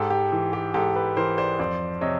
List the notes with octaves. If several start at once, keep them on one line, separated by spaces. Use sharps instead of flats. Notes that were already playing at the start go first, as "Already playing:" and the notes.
Already playing: G#2 G4 A4
G4
E3
G4
G#2 G4 A4
A4 B4
E3 A#4 C5
C5 D5
F2 C5 D5
C3 C#5 D#5